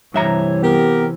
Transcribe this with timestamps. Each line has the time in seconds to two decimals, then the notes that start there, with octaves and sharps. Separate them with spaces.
0.14 G2 C3 E3 C#5 E5 A#5
0.63 B3 G4 A#4